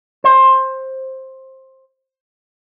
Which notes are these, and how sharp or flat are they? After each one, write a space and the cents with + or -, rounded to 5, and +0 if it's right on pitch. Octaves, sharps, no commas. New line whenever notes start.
C5 +15